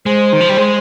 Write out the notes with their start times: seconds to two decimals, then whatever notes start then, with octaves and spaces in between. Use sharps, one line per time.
0.06 G#3 C5
0.33 D#3
0.41 F3
0.48 G3
0.57 G#3